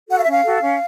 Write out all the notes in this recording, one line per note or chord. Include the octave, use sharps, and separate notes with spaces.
F#4 A4 F#5
F5
E5
C#4
F5
F#4 A4
C#4